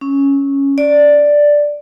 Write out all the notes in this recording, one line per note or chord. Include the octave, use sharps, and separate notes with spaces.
C#4
D5